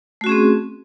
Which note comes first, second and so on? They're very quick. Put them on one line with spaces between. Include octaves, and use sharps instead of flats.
A3 F#4 C#4 G#4 C4